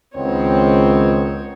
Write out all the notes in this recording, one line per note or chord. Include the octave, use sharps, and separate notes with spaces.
C#2 D#3 B3 C4 C#5